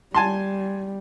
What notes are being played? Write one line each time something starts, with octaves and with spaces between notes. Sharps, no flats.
G3 G#5 A5 C6